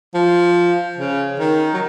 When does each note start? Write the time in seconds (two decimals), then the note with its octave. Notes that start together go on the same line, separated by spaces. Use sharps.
0.14 F3
0.97 C#3
1.39 D#3
1.74 F#3